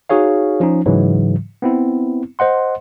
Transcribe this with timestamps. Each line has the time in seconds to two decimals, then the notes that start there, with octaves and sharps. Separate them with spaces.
0.09 D#4 F#4 G#4 C#5 F5
0.60 F3 C#4 D#4
0.86 G#2 C#3 E3 F#3
1.62 B3 C4 E4
2.39 C5 D#5 F#5 C6